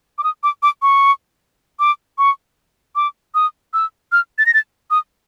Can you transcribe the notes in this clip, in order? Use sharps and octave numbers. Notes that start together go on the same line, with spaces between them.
D6
D#6
D6
D6
C#6
D6
C#6
D6
D#6
E6
F6
A6
A#6
A6
D#6